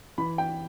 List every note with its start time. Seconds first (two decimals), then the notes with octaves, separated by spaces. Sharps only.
0.18 E3 B5
0.38 G5